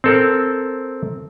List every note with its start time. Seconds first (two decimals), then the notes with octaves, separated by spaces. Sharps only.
0.04 C4 A4 A#4